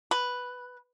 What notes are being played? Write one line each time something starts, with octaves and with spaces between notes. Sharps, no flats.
B4